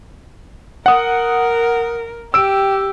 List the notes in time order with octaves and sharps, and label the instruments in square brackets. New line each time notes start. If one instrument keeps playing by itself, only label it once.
[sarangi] A#4 [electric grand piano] F#5 D#6
[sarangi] G4 [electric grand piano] E6 D7